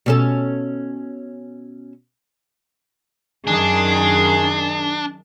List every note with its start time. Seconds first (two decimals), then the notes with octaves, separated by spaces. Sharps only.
0.06 B2 C#4 A4
3.47 F#2 D#3 D4 G#4